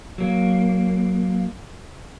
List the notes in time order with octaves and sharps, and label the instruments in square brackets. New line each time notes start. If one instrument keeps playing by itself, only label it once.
[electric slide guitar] F#3 A#3